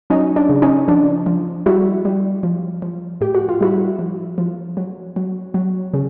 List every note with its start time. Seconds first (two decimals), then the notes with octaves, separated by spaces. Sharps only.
0.10 F#3 C#4 D#4
0.36 D4
0.49 C#3
0.62 C#4 D#4
0.88 F3 D4
1.26 F3
1.66 G3 E4 F#4
2.05 G3
2.43 F3
2.82 F3
3.21 A2 G4
3.35 F#4
3.49 F4
3.61 G3 E4 F#4
3.99 F3
4.38 F3
4.77 F#3
5.16 F#3
5.54 F#3
5.94 C#3